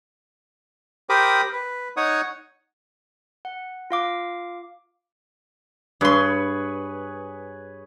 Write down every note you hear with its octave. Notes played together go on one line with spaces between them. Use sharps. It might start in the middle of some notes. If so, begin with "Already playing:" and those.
G4 A#4 C5 B5 D6 D#6
B4
D#4 C#5 F#5 C#6 D#6
F#5
F4 F5 D6
G2 G#4 B4 C#5 C6